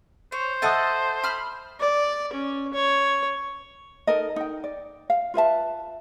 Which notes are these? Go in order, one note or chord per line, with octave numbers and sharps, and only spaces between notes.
C5 C#5
A4 D#5 E5 F#5 A5 D#6
B5 F6
D5
C#4
C#5
D#4 A4 A#4 D#5
D#4 G5
D5
F5
F4 B4 E5 A5